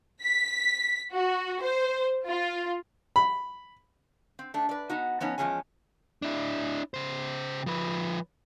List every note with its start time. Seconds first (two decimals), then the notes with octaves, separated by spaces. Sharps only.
0.21 B6
1.11 F#4
1.60 C5
2.27 F4
3.16 B5
4.39 C4
4.54 A3 D4
4.69 B4 D5
4.90 B3 D#4 F#4
5.20 F3 B3 C#4 D#4
5.38 E2 B2 F3 G#3 C#4 G#5
6.22 D4 E4
6.94 C#3 C5
7.66 F3 B4